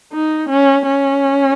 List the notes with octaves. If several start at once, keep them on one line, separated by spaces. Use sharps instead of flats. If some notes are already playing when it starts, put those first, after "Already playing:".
D#4
C#4
C#4